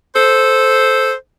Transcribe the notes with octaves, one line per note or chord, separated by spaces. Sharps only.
A4 C5